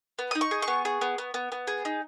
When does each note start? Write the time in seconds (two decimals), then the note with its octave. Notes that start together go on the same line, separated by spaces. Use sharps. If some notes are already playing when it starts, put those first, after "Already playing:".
0.19 B3
0.31 D#6
0.35 D#4
0.41 C#6
0.51 G#4
0.62 C#6
0.68 B3
0.85 G#4
1.01 B3
1.18 B3
1.34 B3
1.52 B3
1.67 G#4
1.85 D#4